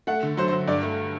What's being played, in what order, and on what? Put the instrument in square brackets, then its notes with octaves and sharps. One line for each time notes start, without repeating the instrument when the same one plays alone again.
[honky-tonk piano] A3 [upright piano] F#5
[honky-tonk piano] D3
[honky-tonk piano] F#3 [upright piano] C5
[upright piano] C5
[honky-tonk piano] F#3
[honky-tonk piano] G2 [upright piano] D5
[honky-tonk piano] A3